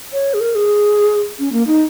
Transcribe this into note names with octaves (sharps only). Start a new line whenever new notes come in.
C#5
G#4
A#4
G#4
C#4
A#3
D#4